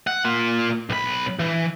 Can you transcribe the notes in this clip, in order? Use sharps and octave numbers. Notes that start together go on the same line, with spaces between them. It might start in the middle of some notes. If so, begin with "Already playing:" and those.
F#5
A#3 F4
B1 B5
E3